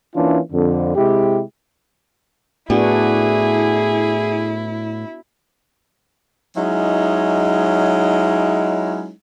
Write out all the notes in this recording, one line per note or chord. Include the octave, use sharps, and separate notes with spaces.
E3 A#3 C#4 D4 E4 F4
F2 D3
C3 G#3 E4 G4
A2 B3 D4 E4 F#4 G#4
F#3 G#3 C#4 D#4 E4